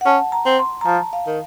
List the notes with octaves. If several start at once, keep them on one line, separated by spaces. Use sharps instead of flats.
F#5
C#4 A5
A#5
C4
C6
A#5
F3 A5
F5
D#3